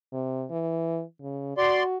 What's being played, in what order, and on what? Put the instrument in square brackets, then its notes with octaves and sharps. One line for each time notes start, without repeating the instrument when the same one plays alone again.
[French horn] C3
E3
C#3
[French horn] F#4 [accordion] D5 C6